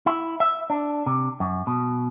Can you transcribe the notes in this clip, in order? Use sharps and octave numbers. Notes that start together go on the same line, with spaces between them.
E4
E5
D4
C3
F#2
B2